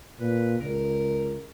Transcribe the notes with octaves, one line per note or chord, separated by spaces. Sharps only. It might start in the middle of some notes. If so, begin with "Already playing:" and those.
A#2 B4
C#2 A#4